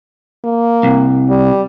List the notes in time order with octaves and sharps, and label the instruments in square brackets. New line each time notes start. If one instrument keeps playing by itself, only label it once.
[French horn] A#3
[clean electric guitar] C2
[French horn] G3